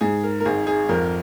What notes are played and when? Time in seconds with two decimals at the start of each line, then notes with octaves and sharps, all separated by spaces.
0.01 G#2 G#4
0.23 A#4
0.40 A#4
0.45 G#1 G#4
0.67 G#4
0.89 F2 A#4